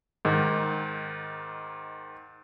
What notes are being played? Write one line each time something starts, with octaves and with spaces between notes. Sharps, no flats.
G#2 D#3